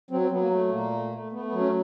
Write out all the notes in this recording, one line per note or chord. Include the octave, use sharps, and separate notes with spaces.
F#3 C4
C4
F#3 B3
A#3
A3
A#2 A#3
A3
A3
A3 B3
B3
F#3
C#4